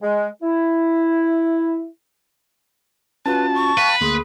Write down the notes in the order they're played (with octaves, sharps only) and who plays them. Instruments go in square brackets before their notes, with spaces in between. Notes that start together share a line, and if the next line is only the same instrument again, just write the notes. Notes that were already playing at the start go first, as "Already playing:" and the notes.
[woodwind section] G#3
E4
[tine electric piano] C#4 F4 F#4 [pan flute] B4 [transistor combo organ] A5
[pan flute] C#6
[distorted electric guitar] B4 [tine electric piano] F5 G5
[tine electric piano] D2 A#3 C6 [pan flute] G#4